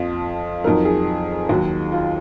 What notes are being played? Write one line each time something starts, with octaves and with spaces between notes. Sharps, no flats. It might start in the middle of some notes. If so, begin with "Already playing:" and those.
Already playing: F2 F3
F2 D#3 F#3 A#4
G#4
D#2 D#3 F#3 F#4
F4